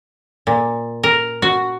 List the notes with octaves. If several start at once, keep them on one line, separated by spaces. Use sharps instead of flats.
A#2
A#4
F#4